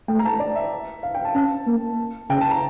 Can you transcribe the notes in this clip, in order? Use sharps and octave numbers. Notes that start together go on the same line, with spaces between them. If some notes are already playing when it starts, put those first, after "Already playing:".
A3 G5
A#5
A5
D5
E5
F5
G5
A5
C#4 A5
A#3
C#3 G5
A5
A#5